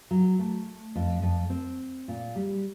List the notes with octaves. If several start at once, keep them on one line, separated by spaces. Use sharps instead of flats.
F#3
A3
F2
F2
C4
A#2
G3